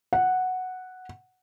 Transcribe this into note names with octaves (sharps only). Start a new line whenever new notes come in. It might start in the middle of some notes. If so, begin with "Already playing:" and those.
F#5